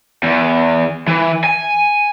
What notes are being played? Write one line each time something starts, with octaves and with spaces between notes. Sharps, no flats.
E2
E3
G#5